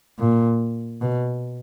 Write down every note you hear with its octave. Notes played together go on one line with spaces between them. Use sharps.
A#2
B2